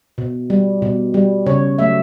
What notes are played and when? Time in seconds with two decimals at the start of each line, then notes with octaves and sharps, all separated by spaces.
0.18 B2
0.50 G3
0.82 B2
1.14 G3
1.46 C#3 C#5
1.79 F#3 A3 E5